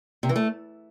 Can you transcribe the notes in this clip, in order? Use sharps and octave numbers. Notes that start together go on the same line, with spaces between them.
C3
E3
A3